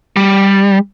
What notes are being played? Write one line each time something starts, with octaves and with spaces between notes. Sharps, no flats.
G3